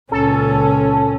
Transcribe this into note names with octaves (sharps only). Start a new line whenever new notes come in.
C#2 A#2 C#4 A4